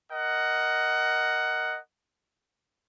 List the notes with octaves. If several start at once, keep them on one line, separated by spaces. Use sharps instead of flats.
A#4 D#5 F#5